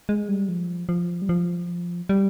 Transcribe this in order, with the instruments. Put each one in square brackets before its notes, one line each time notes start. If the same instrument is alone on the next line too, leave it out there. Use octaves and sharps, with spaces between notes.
[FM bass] G#3
G3
F3
F3
G3
F3
G3